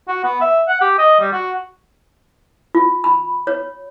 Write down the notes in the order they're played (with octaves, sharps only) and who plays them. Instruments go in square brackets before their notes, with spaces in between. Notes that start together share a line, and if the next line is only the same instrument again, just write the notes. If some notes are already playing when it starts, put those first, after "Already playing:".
[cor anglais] F#4
B3
E5
F#5
G4
D#5
G3
F#4
[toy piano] F4
B5
C#5